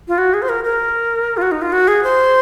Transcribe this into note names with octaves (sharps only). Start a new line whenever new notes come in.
F4
F#4
G#4
C5
A#4
A#4
F4
F#4
D#4
F4
F#4
G#4
C5